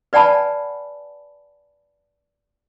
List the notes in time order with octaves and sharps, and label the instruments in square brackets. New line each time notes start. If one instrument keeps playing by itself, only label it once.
[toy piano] B4 D5 F#5 G#5 A5 B5